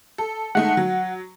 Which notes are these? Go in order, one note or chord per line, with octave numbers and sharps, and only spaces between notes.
A4
G#3 A3 D#4 F#5
F#3